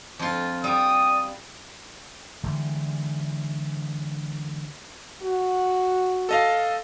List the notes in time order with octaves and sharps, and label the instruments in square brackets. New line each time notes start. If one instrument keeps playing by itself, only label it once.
[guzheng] F2 F4
[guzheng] G3 [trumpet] D#6
[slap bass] D3 E3 G3 G#3
[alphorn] F#4
[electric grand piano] A4 D#5 F5